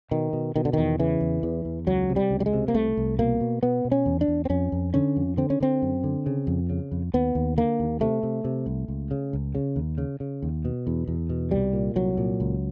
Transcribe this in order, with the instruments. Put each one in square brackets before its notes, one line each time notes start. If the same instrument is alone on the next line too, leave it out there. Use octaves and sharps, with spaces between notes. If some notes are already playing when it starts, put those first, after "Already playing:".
[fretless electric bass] B2 D#3
B2
B2 D#3
D3
E2 D#3
C#3 E3
E2
E2
E2
C#2 F#3
C3
G3
C#2
G3
G#3
C3
A#3
C2 A3
C2
B2 A#3
B2
B2 B3
B2
C#4
E2
D4
E2
C4
F2 C#4
F2
D3 C#4
F2
D3 C4
C#4
D3 C4
F#2
D3
C#3
F2
C#3
F2
D#2 B3
D#2
D3 A#3
D#2
C3 A3
C3
C3
C2
C#2
C#3
C#2
C#3
D#2
C#3
C#3
D#2
B2
E2
E2
B2
C2 G3
A#2
C2 F#3
A#2
C#2